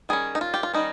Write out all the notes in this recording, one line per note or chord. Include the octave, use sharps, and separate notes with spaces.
D#3 G3 C#4 G#4
D#4
F4
G4
F4
D#3 G3 C#4 D#4